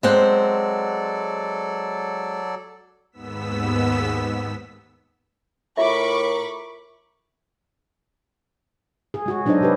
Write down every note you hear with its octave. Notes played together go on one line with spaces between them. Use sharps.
F#3 G#3 C4 A4 D5 F#5
D#2 G#2 B3 E6 B6
A2 F4 A#4 E5 B5 C#6 D6
G#4
G#3 F#4 G#4
F#3 D4 D#4 A4 C5 D#5
C3 G4 B4